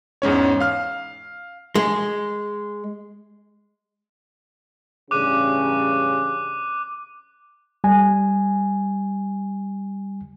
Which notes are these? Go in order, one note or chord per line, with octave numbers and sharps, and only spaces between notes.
E2 G#2 C#4 C#5
F5 F6
G#3
A1 G2 C#3 D6 F#6 D#7
G3 G#5